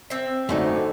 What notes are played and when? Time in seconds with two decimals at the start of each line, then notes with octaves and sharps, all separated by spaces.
0.10 C4 E5
0.49 F#2 D3 A3 D#4